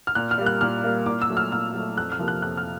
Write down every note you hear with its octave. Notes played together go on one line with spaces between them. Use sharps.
F6
A#2 F#6
F6
G3 A#3
F#6
A#2 F6
G3 A#3
A#2 D6
E6
F#3 A3
F6
A#2 F6
F#3 A3
F2 F#6
F6
C3 F3 A#3
F#6
F2 F#6
F6